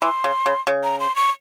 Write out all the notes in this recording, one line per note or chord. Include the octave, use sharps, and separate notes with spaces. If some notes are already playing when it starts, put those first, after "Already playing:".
E3 C6
C#3
C#3
C#3
A#5
C6
C#6